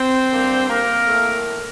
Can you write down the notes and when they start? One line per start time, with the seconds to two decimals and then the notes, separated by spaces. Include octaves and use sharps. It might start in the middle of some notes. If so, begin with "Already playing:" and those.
Already playing: C4 C5
0.29 D3 G3 A#3
0.68 A#3 A#4
1.05 A2 A3